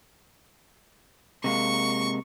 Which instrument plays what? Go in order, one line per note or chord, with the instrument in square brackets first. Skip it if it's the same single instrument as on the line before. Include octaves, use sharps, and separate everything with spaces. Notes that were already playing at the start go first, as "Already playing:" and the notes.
[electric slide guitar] C3 G#3 A#3 [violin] C#6